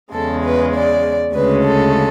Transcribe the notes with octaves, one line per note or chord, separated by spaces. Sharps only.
E2 C#3 G#3 A4
B4
D5
D2 C#3 G#3 C#4 B4
A4